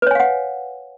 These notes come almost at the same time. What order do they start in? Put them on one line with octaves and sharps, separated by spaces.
B4 C#5 G#5 F5 F#5